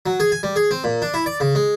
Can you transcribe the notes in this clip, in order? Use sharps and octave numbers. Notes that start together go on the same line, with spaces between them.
F#3
G#4
G#5
G3
G#4
C4
A#2
D4
E4
D5
C#3
G#3